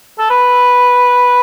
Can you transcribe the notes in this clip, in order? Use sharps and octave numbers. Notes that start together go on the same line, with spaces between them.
A4
B4